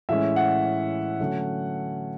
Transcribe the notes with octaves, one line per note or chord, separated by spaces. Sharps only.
A2 E3 G#3 C#4 E5
F#5
D3 F#3 A3 C#4